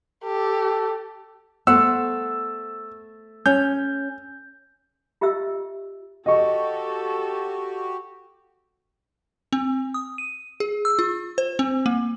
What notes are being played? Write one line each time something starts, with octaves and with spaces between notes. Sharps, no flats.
G4 A4
A3 B3 C5 F#5 E6
C#4 G6
F4 G4 D#5 E5 E6
F#4 G4 A4 D#5 C#6
C4
D#6
D#7
G#4
E6
F4
C5
C4
A#3